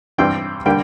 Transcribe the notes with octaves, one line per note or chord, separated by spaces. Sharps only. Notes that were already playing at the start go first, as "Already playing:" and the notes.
G2 E3 G3 C4 G5
D3 G3 A#3 G5